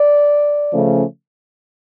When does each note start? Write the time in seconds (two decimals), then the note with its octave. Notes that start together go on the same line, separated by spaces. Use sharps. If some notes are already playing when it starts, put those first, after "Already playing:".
Already playing: D5
0.73 C#3 F3 A3 C#4